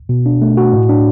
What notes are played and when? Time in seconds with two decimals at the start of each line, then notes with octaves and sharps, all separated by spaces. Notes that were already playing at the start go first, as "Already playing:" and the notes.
0.09 B2
0.26 D4
0.42 A3
0.57 F#4
0.73 A2
0.89 D4